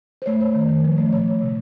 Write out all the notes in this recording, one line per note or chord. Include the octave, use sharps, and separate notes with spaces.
C5
A3 C#5
A3 C5
D#3
D#3
F3
A3
A#2 C#5
A#2
C3